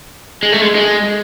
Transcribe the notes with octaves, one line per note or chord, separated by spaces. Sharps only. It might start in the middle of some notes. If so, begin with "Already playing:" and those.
G#3
A3
G#3
G#3